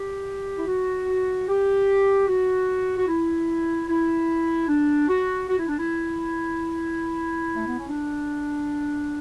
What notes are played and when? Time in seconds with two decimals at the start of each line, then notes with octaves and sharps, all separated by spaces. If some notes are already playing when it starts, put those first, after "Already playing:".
Already playing: G4
0.57 E4
0.67 F#4
1.48 G4
2.28 F#4
2.97 F#4
3.08 E4
3.89 E4
4.68 D4
5.08 F#4
5.49 F#4
5.59 E4
5.68 D4
5.78 E4
7.56 A3
7.67 B3
7.78 C#4
7.88 D4